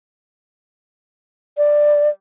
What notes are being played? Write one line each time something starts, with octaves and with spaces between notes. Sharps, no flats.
D5